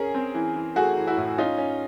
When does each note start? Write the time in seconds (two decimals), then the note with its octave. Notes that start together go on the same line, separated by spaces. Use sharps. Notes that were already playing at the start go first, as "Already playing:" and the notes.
Already playing: C#4 G#4 A#4
0.15 C4
0.35 E3
0.55 E3
0.76 A3 F#4 G#4
0.97 E3
1.07 E4 F#4
1.17 A2
1.38 C#4 D#4 F4
1.58 C#4